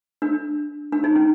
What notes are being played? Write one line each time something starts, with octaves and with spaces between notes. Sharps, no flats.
D4
D4
D#4
C#4